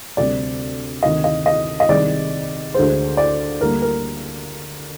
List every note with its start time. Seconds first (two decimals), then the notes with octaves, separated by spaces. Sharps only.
0.17 D2 C3 G3 D5
1.03 D2 C3 D#3 D#5
1.24 D#5
1.46 D#5
1.80 D#5
1.89 C2 C3 D#3 G#3 D5
2.74 D2 D3 G#3 C5
3.17 D5
3.61 D2 D3 G3 A#3 A#4
3.82 A#4